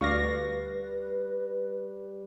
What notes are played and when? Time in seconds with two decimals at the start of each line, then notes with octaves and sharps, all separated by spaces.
0.01 D2 G3 B4 D5 F5 C#6 A#6